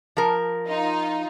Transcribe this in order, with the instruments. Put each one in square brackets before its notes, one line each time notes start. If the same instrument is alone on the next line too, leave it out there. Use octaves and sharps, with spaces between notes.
[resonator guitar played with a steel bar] F3 A#4
[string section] D#4 F4